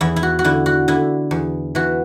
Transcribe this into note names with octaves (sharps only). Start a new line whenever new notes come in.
E2 E4
E4
F#4
F#4
D3 E4
F#4
D3 E4
E2
E3 F#4